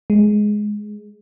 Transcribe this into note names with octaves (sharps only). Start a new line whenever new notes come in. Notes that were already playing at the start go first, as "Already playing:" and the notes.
G#3